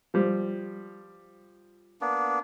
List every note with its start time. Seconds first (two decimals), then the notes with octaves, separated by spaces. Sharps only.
0.14 F3 G3
2.01 A#3 B3 D4